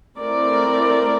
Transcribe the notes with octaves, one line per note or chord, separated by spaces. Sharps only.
A3 C4 E4 A#4 D5